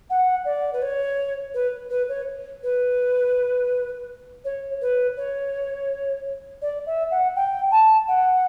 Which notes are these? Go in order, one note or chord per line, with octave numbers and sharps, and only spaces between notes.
F#5
D5
B4
C#5
B4
B4
C#5
B4
C#5
B4
C#5
D5
E5
F#5
G5
A5
F#5